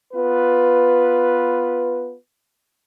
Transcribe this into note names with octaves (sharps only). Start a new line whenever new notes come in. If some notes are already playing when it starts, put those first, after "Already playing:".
B3 F4 B4